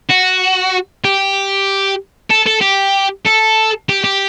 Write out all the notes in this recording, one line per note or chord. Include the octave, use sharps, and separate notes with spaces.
F#4
G4
A4
A4
G4
A4
G4
G4